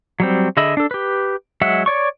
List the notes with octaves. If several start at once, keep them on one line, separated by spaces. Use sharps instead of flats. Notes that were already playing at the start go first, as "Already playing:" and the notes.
F#3 G3 C4
D3 G#4 D#5 E5 B5
D4 A4
G4 B4
F#3 G#3 E5 F#5
C#5 D5 C#6